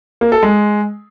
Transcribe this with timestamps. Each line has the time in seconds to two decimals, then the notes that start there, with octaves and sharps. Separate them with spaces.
0.21 A#3
0.32 A4
0.43 G#3